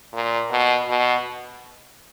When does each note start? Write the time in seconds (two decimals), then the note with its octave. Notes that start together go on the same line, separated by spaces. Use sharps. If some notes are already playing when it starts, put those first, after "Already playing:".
0.14 A#2
0.51 B2
0.88 B2